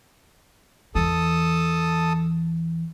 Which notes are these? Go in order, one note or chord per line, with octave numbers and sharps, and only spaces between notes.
E2 E3 A4 A5 D#6